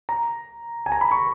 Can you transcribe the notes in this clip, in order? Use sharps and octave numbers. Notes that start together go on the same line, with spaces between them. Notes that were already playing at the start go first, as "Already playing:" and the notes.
A#5
G#5
A#5
B5
C#6